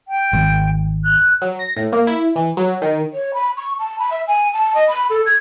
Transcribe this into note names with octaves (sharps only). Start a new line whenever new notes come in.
G5
G#1
F#6
F#3
A#6
A2
A#3
E4
E3
F#3
D#3
C#5
B5
C#6
A5
B5
E5
G#5
A5
D#5
B5
A4
G#6